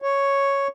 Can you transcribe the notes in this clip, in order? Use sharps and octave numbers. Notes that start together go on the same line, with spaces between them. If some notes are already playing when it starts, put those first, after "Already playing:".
C#5